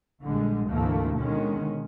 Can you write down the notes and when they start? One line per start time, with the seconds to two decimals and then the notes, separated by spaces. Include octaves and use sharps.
0.23 A#1 D3 G3 G#3
0.69 D2 G#2 C3 E3 A3 A#3
1.16 B2 D3 D#3 G#3 C#4